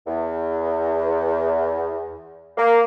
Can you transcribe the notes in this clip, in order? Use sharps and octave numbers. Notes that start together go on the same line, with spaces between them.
E2
A#3